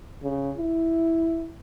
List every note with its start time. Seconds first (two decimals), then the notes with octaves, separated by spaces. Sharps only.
0.23 C#3
0.57 E4